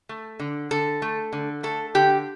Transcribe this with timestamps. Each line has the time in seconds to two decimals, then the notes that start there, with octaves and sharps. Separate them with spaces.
0.09 A3
0.40 D3
0.71 D3 A4
1.02 A3
1.33 D3
1.63 A3 A4
1.95 D3 G4